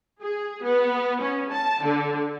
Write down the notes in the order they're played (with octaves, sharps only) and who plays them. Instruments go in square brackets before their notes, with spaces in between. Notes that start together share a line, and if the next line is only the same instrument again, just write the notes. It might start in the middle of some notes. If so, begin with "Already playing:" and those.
[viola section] G#4
B3
C#4
A5
D3